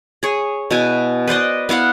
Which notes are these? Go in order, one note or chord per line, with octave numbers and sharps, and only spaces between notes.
G#4 C#5
B2 E4 G#5
B4 C5 D5 D#5
B3 E4 F5 F#5